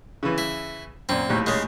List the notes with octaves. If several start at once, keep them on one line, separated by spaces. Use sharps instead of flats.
C#3 E3
E4
F#2 A#2 C4
A#1 D#2 A2
C#3 G#3